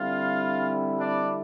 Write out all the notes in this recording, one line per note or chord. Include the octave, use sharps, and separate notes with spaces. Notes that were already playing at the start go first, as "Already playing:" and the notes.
Already playing: D3 G3 C4 E4 F4 F5
D4 D5